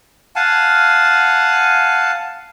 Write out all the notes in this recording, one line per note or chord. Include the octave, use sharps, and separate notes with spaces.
F5 F#5 G#5 A5